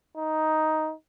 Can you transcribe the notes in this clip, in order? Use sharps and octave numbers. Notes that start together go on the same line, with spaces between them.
D#4